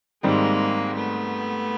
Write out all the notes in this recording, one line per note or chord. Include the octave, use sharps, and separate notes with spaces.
G#2 D#3 G3 G#3 A#3 C4
A3 B3